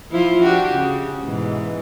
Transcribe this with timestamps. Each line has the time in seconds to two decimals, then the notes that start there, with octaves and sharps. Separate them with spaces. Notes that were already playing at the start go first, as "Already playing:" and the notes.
0.11 F3 E4 F4
0.42 D4 F#4 G4
0.74 C#3
1.24 G#2 B2 E3